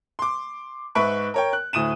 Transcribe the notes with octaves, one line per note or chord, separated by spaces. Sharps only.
C6 D6
G#2 B4 E5 B5 C#6 D7
A#4 C#5 G5
F#6
D2 A2 D#6 D#7 E7